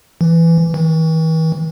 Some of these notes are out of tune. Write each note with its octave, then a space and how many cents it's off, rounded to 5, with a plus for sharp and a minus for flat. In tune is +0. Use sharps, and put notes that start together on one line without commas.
E3 +15
E3 -45